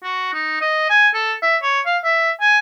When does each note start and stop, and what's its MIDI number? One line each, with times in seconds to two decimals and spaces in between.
0.03 0.33 66
0.34 0.58 63
0.61 0.85 75
0.90 1.08 80
1.14 1.33 69
1.42 1.57 76
1.62 1.80 73
1.86 1.98 77
2.04 2.32 76
2.41 2.58 80